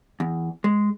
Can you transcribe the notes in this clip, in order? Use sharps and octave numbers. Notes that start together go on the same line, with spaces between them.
E2
G#3